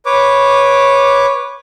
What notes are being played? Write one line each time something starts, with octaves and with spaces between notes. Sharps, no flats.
B4 C#5 D6